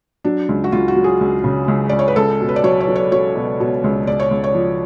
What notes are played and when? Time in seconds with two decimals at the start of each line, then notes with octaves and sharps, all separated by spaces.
0.24 F#3 D4
0.49 C#2
0.64 F#4
0.72 C#2 F4
0.88 F#4
0.96 F#3
1.04 G#4
1.21 C#2
1.44 C#3
1.68 C#2
1.89 C#2 D5
1.99 C#5
2.08 B4
2.16 C#2 A4
2.41 B2
2.49 B4
2.56 D5
2.64 F#3 C#5
2.80 C#5
2.88 F#3
2.96 C#5
3.12 F#3 C#5
3.35 B2
3.60 B2
3.84 C#2
4.07 C#2 D5
4.20 C#5
4.31 C#2
4.44 C#5
4.55 F3